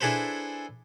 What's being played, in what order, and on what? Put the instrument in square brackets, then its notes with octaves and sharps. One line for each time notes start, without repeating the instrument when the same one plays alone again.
[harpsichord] D4 E4 G#4 A4 B4 C5